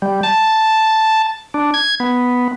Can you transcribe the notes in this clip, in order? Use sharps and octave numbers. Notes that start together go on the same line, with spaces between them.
G3
A5
D4
G#6
B3